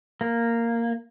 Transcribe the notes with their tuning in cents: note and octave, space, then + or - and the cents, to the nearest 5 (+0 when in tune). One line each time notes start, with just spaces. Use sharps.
A#3 -5